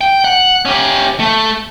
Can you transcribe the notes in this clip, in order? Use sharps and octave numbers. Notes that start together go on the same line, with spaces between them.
G5
F#5
C#4 G4
A3